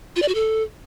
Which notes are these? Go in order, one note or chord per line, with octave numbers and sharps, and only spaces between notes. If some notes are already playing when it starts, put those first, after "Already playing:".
F4
D5
F#4
A4